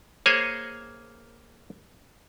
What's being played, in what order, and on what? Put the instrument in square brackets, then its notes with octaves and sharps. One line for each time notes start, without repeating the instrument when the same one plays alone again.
[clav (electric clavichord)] A#3 G#4 C5 C#5 G#5